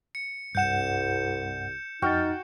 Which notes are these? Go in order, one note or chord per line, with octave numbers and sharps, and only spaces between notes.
C#7
C2 G2 F#5 G6 C#7 E7
F2 D#4 F#4 G5 F6 A6